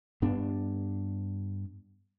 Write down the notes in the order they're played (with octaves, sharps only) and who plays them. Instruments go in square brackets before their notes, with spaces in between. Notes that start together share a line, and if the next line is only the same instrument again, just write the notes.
[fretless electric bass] G2 B3 D4